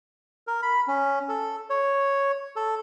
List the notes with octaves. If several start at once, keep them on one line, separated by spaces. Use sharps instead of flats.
A#4
B5
C#4
A4
C#5
A4